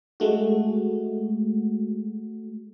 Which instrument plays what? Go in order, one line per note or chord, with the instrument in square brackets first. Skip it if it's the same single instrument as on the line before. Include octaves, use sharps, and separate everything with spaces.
[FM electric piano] G#3 A3 F#4